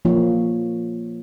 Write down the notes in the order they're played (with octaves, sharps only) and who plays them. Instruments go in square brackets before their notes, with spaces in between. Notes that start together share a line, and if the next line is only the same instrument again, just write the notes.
[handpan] F3 A#3 F4 C#5